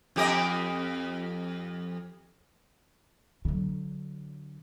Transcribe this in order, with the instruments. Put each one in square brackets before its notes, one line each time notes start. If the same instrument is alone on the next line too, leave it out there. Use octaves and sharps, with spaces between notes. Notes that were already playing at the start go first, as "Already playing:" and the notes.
[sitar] F2 G4 D#5
[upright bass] D3 F#3